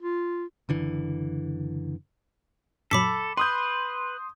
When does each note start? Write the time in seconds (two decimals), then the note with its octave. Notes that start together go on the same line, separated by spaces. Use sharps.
0.02 F4
0.69 F#1 D3 E3
2.91 F#2 A#2 F#3 A4 B5 D6 B6
3.37 B4 C6 D#6 G6